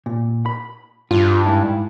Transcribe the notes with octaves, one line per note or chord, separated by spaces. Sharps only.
A#2
B5
G2 F4
G#2 E4